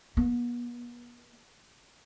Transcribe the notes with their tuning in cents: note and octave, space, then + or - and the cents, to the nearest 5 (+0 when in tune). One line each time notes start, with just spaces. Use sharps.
B3 -40